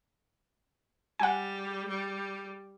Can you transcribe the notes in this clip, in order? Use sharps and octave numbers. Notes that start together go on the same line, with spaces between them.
G3 F#5 G#5
G3